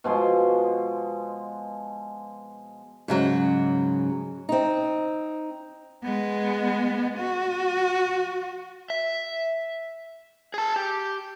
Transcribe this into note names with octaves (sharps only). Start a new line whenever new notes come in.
B2 F3 G#3 C6
G#2 C#3 F#3
C4 D#4
G#3 B3
F#4
E5
G#4 A5
G4